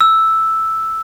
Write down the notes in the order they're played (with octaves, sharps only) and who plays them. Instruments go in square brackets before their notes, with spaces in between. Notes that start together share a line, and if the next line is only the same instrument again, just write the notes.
[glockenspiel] E6